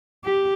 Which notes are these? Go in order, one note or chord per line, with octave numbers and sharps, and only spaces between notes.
G4